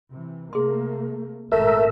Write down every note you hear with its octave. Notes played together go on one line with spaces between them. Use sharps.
C3 E3
C3 A3 A#3 G#4 C6
G#1 A#2 A3 A#4 E5